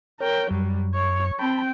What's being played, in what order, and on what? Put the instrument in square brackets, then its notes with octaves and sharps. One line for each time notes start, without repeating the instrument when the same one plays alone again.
[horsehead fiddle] A#4 G5 [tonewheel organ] C#5
[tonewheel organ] F#2 [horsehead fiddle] F#3 G3
[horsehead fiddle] C#5
[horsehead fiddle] C4 G5 [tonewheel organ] A5 B5